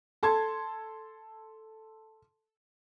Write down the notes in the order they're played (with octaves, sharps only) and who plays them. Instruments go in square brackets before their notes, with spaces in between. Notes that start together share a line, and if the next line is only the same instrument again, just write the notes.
[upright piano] A4 A5 C6 G#6